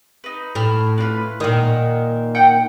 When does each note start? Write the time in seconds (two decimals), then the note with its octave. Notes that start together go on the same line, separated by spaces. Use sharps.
0.24 D#4 B4
0.55 A2 A5 B5 F6
0.98 D4 F4 B4
1.40 A#2 D#3 F#5 D#6
2.35 F#5 G5 G6